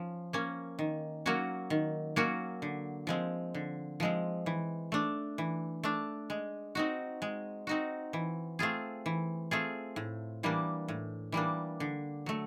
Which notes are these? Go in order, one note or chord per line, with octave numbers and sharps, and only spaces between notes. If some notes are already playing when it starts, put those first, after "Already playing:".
Already playing: F3 C#4
A#3 C#4
D#3
F#3 A#3 C#4 F#4
D#3
F#3 A#3 C#4 F#4
D3
F3 G#3 C4
D3
F3 G#3 C4
E3
A3 D4
E3
A3 D4
G#3
C4 D#4 F#4
G#3
C4 D#4 F#4
E3
A3 C4 F4 G#4
E3
A3 C4 F4 G#4
A2
E3 G3 A#3 D4
A2
E3 G3 A#3 D4
D3
F#3 A3